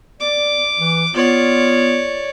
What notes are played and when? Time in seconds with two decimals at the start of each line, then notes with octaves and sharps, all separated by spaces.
0.21 D5 D6
0.78 E3
1.15 B3 F4 C#5 D5